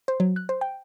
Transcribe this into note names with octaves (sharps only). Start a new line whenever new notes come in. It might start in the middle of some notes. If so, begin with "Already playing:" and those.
C5
F#3
F#6
C5
G5